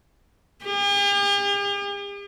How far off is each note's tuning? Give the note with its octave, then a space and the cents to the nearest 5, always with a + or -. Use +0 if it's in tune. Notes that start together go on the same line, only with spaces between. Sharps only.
G4 +45